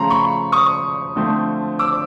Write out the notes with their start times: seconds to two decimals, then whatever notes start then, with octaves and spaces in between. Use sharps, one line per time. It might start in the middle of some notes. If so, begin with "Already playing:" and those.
Already playing: C#3 F3 A3 A#5 C6
0.10 B5 C#6
0.52 C#6 D#6
1.16 D3 F3 A3 C4
1.79 D6 E6